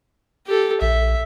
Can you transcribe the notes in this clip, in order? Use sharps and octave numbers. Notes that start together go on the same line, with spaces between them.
G4 A4
A#1 E5